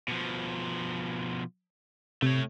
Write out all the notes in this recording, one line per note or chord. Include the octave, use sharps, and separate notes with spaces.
B2 F3
C3 A3 C#5